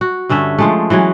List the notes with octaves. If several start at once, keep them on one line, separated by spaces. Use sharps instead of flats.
F#4
G2 D3 C#4 E5
F3 G#3 A3
E3 F#3 G#3 C#4